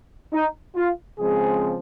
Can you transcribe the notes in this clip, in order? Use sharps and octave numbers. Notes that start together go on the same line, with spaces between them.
D#4
F4
C#3 F3 G#3 C4 G#4